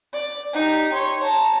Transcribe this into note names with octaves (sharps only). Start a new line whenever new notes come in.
D5
D#4 G4
C#5 C6
A5 A#5